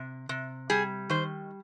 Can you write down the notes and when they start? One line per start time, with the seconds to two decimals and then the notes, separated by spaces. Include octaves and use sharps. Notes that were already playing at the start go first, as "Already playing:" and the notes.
Already playing: C3
0.29 C3
0.70 G3 G#4
1.10 D#3 C5